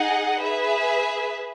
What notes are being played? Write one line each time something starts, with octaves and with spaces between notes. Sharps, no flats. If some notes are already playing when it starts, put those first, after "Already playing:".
Already playing: D#4 G#4 D#5 F#5
G#4 B4 E5